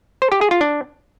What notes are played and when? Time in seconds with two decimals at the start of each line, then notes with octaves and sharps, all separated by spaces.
0.22 C5
0.32 G4
0.41 G#4
0.51 F4
0.61 D4